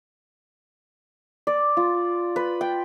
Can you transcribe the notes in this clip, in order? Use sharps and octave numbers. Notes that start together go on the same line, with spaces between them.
D5
F4
B4
G5